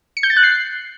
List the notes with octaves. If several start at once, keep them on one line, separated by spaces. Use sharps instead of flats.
C#7
G6
A6
F#6
C7